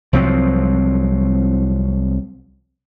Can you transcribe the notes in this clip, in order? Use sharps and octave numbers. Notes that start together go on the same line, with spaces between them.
C2 F3 F#3 C4